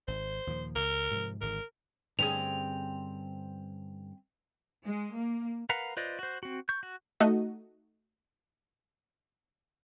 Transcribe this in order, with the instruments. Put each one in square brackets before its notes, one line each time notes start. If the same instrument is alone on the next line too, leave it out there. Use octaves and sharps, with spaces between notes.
[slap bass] G#1 [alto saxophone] C5
[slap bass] D#2 A#2 F3
[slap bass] C#2 [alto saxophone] A#4
[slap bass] G#2 C3 F3
[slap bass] G#1 G#2 D3 [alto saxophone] A#4
[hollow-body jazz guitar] G2 D3 [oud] C4 C#4 G#4 [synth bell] F7
[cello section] G#3
A#3
[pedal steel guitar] A#4 B4 F5 F#5 A#5
F4 B4 C5 D5 D#5
F#4 C5
C4 F#4
C#6 G6
F#4
[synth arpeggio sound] A3 D#4 F#4 D#5